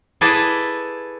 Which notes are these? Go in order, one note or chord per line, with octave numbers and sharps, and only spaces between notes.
E4 G#4 A4 B4 D5 D#5